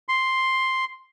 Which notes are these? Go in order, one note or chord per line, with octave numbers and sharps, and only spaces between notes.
C6